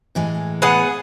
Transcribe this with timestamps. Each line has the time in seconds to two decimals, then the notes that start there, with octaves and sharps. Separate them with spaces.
0.15 A2 E3 G#3
0.62 B3 G#4 F#5